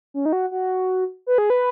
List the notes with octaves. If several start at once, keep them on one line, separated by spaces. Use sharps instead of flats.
C#4
D#4
F#4
F#4
B4
G#4
B4